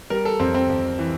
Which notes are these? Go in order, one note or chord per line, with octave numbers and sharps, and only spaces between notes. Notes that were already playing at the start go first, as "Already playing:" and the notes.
G3 A#4
A4
F2 C4
C4
F2
E3